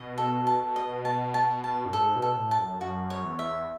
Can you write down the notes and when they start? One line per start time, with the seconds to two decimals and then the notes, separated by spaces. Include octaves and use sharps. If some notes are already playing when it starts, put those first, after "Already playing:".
Already playing: B2 D#5
0.18 A4
0.47 A5
0.76 D#5
1.05 A5
1.34 A5
1.64 A5
1.86 F#2
1.93 G#2 A4
2.16 B2
2.22 A4
2.36 A2
2.51 A5
2.58 F#2
2.81 F#2 F#4
3.10 C#5
3.24 E2
3.39 E5